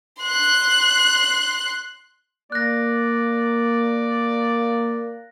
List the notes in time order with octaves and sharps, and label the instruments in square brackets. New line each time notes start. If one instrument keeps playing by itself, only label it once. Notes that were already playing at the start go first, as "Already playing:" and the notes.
[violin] C6 F#6
[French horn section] A#3 [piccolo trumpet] D5 [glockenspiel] F#6 A#6